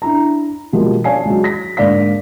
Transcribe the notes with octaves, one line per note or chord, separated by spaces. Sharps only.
D4 E4 A#5
B2 F3 G3 G#3 A#3
C#5 D5 F5 G#5 A5 C7
F#3 G#3
A#6 B6
G#2 D3 A#3 D5 F5 B6